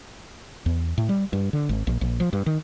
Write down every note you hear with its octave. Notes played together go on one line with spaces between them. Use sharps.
E2
A2
G3
G2
D3
G#1
A#1
A#1
F3
G2
D#3